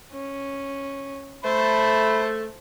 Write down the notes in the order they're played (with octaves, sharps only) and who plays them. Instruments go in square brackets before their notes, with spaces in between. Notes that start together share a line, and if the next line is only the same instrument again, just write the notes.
[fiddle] C#4
[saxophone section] A3 [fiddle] A4 C5 [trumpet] B5